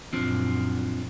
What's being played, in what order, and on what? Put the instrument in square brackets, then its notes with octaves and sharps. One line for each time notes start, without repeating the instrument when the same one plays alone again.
[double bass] F#2 A#2 [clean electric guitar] F3 C4 D4